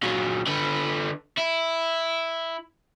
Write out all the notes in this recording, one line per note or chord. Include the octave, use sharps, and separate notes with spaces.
A#2 F#3
D3 B4
E4